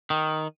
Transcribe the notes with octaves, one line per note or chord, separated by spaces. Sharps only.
D#3